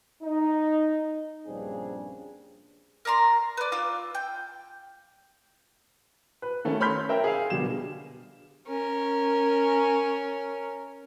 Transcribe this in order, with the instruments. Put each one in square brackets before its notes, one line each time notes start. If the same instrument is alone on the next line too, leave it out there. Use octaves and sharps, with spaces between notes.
[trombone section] D#4
A#1 G2 C#3 C4 D4 G#4
[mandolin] A#4 D5 A#5 C6
B4 D5
F4 D6 E6
G5
[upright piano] B4
D#3 A3 C#4
C#5 B5 C6 F6 G6 B6
A#4 E5 G5
G#4 F5
B2 D3 G3 E7
[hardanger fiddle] C#4 A#4